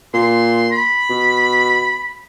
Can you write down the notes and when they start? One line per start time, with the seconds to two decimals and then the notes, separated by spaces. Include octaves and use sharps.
0.14 A#2 C6
0.71 B5
1.09 B2